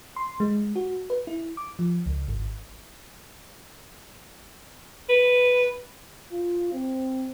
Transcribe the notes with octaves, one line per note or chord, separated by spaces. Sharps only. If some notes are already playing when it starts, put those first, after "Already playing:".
C6
G#3
F#4
B4
E4
D6
F3
C#2
G#1
B4
F4
C4